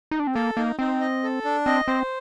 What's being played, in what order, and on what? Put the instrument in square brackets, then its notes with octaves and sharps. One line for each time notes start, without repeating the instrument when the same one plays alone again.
[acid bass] D#4
D4
C4
[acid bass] A#3 [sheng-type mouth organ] A4
[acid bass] A#3 [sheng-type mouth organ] D#4
[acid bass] C4 [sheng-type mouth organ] D#4
[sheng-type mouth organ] D#5
A4
D4
[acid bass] C4 [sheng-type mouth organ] D#5
[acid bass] C4 [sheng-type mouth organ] C5